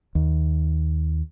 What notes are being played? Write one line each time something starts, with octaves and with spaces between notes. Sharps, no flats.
D#2